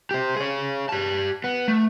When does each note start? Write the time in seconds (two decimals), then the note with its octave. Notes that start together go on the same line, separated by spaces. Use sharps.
0.11 G4 C5
0.36 G#4 C#5
0.89 G4 A5
1.44 B3
1.68 A3